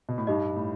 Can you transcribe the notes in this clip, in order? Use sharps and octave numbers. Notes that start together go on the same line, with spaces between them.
B2
A2
G2 D#4 G4 D#5
A2